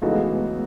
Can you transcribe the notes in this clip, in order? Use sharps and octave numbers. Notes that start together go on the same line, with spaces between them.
C#3 E3 G#3 A3 B3 D#4 F#4